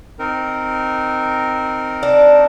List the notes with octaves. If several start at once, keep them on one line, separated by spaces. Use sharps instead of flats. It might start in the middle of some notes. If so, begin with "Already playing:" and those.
C4 D#4 A#4
D4